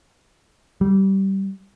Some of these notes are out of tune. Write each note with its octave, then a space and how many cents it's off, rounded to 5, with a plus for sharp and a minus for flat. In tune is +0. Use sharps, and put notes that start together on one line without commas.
G3 -20